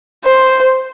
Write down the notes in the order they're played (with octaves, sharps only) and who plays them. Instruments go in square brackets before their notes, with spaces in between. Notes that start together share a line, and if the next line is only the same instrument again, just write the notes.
[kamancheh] C5